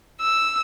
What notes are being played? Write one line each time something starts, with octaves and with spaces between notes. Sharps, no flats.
E6